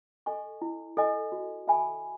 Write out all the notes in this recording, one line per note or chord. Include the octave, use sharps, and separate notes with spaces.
A4 D#5 G#5 C#6
E4
A4 D#5 G#5 C#6
F#4
A4 E5 G#5 B5